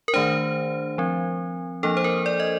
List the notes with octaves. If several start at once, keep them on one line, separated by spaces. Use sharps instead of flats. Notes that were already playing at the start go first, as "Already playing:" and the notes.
A#4
D#3 A3 D4 C5
F3 C4
F3 A#3 D4 A4
C5
A#4
D5
D#5